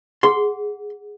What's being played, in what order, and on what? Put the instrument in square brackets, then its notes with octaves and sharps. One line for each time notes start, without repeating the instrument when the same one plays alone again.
[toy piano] G#4 F#5 [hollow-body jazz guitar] C6